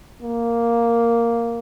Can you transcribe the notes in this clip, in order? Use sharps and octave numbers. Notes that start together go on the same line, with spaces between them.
A#3